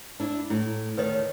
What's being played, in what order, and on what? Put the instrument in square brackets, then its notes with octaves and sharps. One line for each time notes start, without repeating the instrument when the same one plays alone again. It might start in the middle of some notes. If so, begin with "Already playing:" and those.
[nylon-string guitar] D4 E4
[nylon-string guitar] A2 [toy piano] E4
[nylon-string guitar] D2 D#3 [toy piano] B4 C#5 D#5